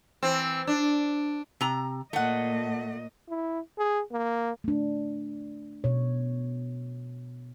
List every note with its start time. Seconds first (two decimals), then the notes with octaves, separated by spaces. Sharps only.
0.23 E3 C4
0.67 D4
1.61 C3 A#5
2.13 A#2 A3 D#5 F#5
3.29 E4
3.78 G#4
4.12 A#3
4.64 A3 D4
5.84 B2 C#5